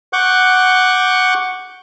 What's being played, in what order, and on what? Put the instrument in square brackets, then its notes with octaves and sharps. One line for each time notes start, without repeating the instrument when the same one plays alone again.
[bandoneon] F#5 C#6 D6 F#6 G6